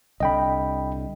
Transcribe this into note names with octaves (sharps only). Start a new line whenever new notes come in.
C2 D3 D#5 G5 B5